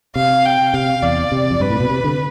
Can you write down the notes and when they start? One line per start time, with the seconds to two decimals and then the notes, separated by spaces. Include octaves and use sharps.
0.16 C3 F5
0.45 G5
0.74 C3 F5
1.03 E2 D5
1.32 C3
1.51 F2
1.60 G2 B4
1.70 A2
1.80 B2
1.90 C3
2.04 D3